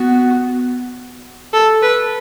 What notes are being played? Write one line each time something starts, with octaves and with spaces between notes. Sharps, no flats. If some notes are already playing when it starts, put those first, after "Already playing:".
Already playing: B3 F#4
A4
B4